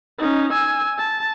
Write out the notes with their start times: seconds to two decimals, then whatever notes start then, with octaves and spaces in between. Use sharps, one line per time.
0.19 C#4 D#4
0.52 G#5 E6
0.98 A5